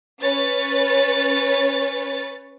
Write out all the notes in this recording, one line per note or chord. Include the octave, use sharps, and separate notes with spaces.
C#4 B4 C#5 A6